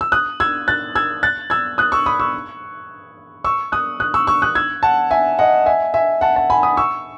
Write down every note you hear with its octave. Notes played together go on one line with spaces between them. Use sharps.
E6
D#6 F#6
E6 G#6
F#6 A6
E6 G#6
F#6 A6
E6 G#6
D#6 F#6
C#6 E6
B5 D#6
C#6 E6
C#6 E6
D#6 F#6
D#6 F#6
C#6 E6
C#6 E6
D#6 F#6
E6 G#6
F#5 A5
E5 G#5
D#5 F#5
E5 G#5
E5 G#5
F#5 A5
F#5 A5
G#5 B5
B5 D#6
C#6 E6